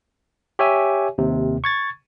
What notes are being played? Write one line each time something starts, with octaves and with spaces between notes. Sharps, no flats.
G4 C#5 E5 G#5
D#2 C3
C#6 G#6 A6